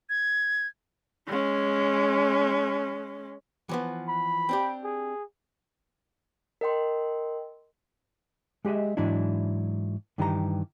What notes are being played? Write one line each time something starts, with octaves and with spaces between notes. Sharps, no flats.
G#6
G#3 C#4
E3 F3 B3
B5
C4 D4 G4
G#4
A#4 D#5 G5 C6
G#3 G4 G#4 D#5 E5
G#2 E3 F#3 D4 E4
G2 D#3 E3 G4 A#4 A#5